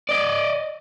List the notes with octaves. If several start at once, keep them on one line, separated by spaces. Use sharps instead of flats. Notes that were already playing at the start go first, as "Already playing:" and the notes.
D5 D#5